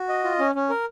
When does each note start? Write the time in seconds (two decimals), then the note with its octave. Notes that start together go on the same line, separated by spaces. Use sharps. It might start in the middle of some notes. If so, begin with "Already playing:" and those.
Already playing: F#4
0.09 D#5
0.24 F4
0.39 C#4
0.55 C#4
0.70 A#4